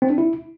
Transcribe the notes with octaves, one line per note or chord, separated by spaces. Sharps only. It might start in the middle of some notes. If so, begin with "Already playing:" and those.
C4
D4
E4